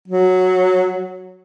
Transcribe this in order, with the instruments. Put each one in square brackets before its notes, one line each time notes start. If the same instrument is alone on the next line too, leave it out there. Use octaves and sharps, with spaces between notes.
[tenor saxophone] F#3